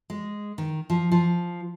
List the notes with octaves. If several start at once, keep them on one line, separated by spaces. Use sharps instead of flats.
G#3
D#3
F3
F3